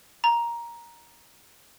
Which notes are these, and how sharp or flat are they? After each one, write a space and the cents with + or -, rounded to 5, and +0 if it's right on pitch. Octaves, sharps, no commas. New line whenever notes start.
A#5 +10